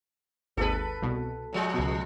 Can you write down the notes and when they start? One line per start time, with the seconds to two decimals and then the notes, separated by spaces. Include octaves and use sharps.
0.57 G#1 D#2 G#4 A4 B4
1.02 C2 B2
1.53 A2 F3 G#3
1.74 C#2 B2